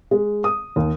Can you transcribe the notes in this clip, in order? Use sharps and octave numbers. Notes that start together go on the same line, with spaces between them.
G#3
D#6
D#2